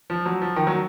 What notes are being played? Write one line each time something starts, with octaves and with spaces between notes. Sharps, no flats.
F3
F#3
F3
D#3
F#3